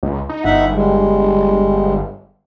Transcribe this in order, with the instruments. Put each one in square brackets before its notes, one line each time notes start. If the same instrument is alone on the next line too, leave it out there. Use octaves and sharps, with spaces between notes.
[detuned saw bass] C#2
D#4
[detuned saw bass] G1 [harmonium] D#4 E5 F#5
[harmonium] G3 G#3